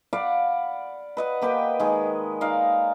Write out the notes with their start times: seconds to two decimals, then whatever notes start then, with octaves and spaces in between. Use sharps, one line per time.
0.13 D5 F5 F#5 B5
1.17 B4 D#5 F#5
1.42 A#3 G4 B4 G5
1.80 D#3 G#3
2.41 D#4 D5 F5